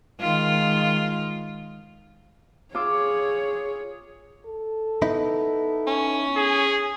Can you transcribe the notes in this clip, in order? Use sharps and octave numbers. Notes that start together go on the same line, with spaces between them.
D#3 G#3 F4
F4 G#4 C#5 D6 E6
A4
B3 D#4 E4
C#4
G#4